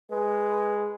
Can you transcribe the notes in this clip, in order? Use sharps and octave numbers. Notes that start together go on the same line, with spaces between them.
G#3 B4